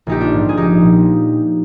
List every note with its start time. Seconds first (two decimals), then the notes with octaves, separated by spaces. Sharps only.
0.07 A#1 D#4 G4
0.21 D4 F4
0.33 G#2 F3
0.49 G#4
0.57 A#1 D#4 G4
0.81 A#2 F3